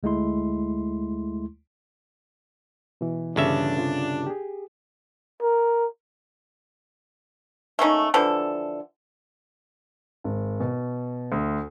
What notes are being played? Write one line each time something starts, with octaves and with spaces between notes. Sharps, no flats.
D2 G#3 A3 E4 C6
B2 E3
G1 C#3 D4 E5
C3 F4
G4 G#4
A#4
A3 A#3 C#4 D#4
D3 E3 F3 A4
G#1
B2
D2